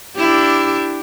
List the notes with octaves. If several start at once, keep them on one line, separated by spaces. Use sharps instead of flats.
D4 E4 G4